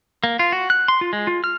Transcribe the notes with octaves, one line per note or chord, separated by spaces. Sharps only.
A#3
F4
F#4
F#6
C6
F4
G#3
F4
F6